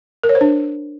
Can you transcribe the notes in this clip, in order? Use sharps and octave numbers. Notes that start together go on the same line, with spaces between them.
A#4
C#5
C5
D4